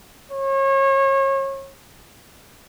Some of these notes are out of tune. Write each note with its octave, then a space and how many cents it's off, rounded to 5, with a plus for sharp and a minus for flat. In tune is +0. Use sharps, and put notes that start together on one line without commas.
C#5 -35